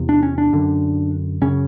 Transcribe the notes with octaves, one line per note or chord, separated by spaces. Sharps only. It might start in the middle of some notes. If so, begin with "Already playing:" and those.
Already playing: E2 C3
D4
C#4
D4
F#2 D3
F#2 C#3 C#4